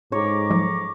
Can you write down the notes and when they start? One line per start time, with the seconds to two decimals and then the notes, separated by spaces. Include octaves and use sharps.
0.12 G#2 A4 C#5 A#5 D6
0.50 F3 F#3